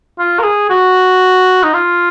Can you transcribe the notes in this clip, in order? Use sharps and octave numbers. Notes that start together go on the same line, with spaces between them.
F4
A#4
G#4
F#4
D#4
F4